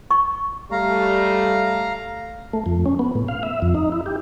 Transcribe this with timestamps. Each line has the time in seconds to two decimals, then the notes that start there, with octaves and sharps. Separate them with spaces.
0.11 C#6
0.72 G3 A3 F5 A#5
2.53 A3
2.66 F2
2.86 C#4
2.99 B3
3.15 A2
3.28 F5
3.43 E5
3.62 F2
3.75 D#4
3.92 E4
4.06 G4